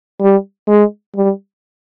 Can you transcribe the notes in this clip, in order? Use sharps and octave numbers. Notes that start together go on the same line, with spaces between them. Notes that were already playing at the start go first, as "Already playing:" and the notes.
G3
G#3
G3